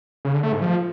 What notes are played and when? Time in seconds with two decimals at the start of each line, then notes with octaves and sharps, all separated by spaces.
0.25 C#3
0.34 D3
0.43 A3
0.52 G#2
0.62 F3